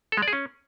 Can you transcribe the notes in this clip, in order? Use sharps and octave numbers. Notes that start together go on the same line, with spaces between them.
A4
G#3
D5
G#4
C#4